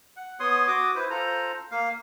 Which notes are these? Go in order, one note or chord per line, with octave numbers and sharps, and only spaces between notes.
F#5
B3 C#5 C6 D#6
F#4 D6 D#6
E4 B4 C5
F4 A4 C5 A#5
A#3 F5